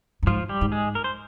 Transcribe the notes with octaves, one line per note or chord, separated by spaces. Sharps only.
G2
G#2 F3 F4
G3 G4
G#2
G#3 G#4
A#4
C5